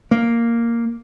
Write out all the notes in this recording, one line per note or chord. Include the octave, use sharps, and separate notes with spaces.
A#3